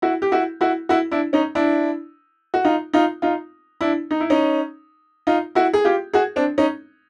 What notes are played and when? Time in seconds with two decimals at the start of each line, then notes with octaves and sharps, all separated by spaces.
0.02 E4 F#4
0.22 G4
0.32 E4 F#4
0.61 E4 F#4
0.89 E4 F#4
1.11 D4 E4
1.33 C#4 D#4
1.55 D4 E4
2.54 F#4
2.64 D#4 F4
2.93 D#4 F4
3.22 D#4 F4
3.81 D4 E4
4.11 D#4
4.20 E4
4.30 C#4 D#4
5.27 D#4 F4
5.55 E4 F#4
5.73 G#4
5.85 F4 G4
6.13 F#4 G#4
6.36 C4 D4
6.58 C#4 D#4